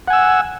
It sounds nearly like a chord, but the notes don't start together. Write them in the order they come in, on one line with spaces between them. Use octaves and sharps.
F#5 G#5 E6